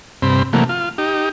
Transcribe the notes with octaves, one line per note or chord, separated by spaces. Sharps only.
G2 C3 C4 B5
C3 E3 F#3 A3 A#3
F4
D#4 G4